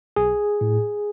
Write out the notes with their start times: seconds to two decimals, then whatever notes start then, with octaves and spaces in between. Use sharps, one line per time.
0.16 B1 G#4
0.61 A2